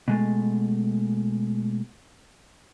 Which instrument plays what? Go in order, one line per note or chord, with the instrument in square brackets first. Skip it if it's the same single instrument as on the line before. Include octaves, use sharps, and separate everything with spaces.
[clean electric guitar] B2 G#3 A3